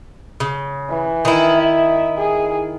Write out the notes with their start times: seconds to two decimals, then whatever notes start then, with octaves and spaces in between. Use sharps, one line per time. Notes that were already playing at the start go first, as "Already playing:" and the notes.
0.40 C#3
0.90 E3
1.25 D#3 E4
1.58 E5
2.17 G#4